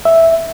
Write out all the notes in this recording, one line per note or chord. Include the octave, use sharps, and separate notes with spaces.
E5